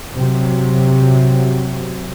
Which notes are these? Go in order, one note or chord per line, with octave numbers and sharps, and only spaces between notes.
C3 F#3